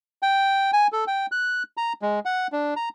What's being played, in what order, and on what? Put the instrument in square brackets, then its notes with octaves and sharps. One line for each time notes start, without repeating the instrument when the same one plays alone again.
[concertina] G5
G#5
A4
G5
F#6
A#5
G#3
F#5
D4
A#5